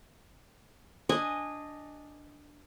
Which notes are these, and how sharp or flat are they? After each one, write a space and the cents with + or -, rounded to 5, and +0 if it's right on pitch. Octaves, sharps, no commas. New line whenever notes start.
D4 +0 D#5 +0 G#5 -15